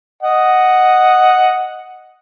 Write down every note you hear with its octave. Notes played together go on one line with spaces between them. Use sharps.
D#5 F#5